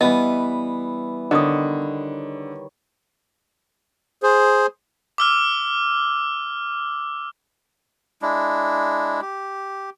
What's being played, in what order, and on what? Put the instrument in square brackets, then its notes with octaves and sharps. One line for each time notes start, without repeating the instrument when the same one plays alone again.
[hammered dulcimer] E3 G3 B4 [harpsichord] B3 [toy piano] D#5
[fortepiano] D3 [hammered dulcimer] D#3 C#5 [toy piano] D#5 D#6
[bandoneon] G#4 C5
[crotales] D6 E6 F6
[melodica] G#3 D4 E4
G4